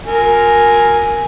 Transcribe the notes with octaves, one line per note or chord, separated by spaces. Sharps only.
A#4 G#5